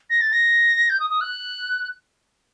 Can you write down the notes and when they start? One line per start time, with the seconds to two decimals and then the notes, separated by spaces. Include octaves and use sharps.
0.10 A#6
0.21 A6
0.33 A#6
0.90 G6
1.00 D#6
1.10 D#6
1.21 F#6